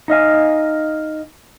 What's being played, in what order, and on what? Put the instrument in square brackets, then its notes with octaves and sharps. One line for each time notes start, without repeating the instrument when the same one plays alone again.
[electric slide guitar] D#4 D#5 F5 G#5